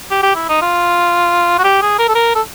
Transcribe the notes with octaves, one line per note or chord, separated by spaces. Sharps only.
G4
G4
E4
D#4
F4
F#4
G4
G#4
A#4
A4
A#4
A4